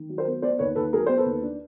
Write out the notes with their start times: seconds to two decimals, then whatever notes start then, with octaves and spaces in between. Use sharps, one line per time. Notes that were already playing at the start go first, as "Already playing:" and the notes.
Already playing: D#3
0.09 F#3
0.18 A#4 C5
0.27 B3
0.42 B3 C5 D5
0.59 D#2 B4 C#5
0.75 D#2 A4 B4
0.93 F#3 G#4 A#4
1.06 B3 C5
1.17 A4 B4
1.26 D#2
1.43 D4